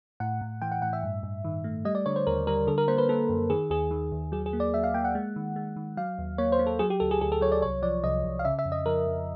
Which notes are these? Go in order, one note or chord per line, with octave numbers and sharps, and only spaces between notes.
A2 F#5
A2
E3 G5
F#5
A2 F#5
E5
G2
G2
D#3
A3
G3 D#5
D5
D3 C#5
C5
D#2 A#4
G3 A#4
D3 A4
A#4
A#3 C5
B4
A#3 A4
F#2
D#3 G#4
D#2 G#4
D#3
D#2
F#3 G#4
G#4
A#3
D5
F#3 E5
F5
A#3 G5
F#5
G#3
D#3
G#3
D#3
F#3 F5
D#2
A#3 C#5
C5
A#3
A4
F#3 G#4
G4
D2 A4
G#4
D2 G#4
A4
F#3 C#5
D5
C2 C#5
F3 D5
C2 D#5
C2
F5
C#3 E5
E5
F2
D#5
F3 A#4
F2